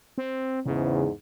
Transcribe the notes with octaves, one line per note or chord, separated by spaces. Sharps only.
C4
E2 G#2 C#3